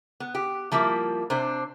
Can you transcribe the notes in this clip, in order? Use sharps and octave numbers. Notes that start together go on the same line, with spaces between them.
B3
G4
F3 G3 A#3 E4
C3 D4 C5